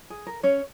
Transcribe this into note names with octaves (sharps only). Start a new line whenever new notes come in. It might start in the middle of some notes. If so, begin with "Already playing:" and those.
G#4
A#4
C#4 C#5